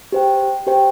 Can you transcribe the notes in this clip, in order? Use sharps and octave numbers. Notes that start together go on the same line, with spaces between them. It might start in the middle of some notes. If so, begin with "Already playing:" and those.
G4 C5 G5
G4 C5 G5